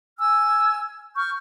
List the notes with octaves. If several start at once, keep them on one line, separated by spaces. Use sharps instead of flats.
G#5 E6 F6
C#6 F6 G6